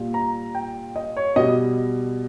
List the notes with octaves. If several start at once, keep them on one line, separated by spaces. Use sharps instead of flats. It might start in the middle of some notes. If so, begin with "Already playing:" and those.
Already playing: A#2 G3
A#5
G5
D#5
C#5
B2 G3 D#5